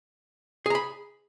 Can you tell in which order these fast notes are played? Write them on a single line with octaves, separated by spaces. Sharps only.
G#4 A#5 B5